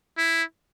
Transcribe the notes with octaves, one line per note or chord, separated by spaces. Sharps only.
E4